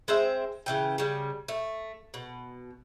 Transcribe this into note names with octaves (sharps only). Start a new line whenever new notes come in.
G#3 C4 C5 E5
C#3 E3 G5
C#3 G3
A3
B2